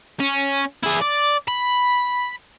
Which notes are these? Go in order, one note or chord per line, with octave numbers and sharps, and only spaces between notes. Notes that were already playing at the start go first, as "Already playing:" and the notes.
C#4
E4 G#4
D5
B5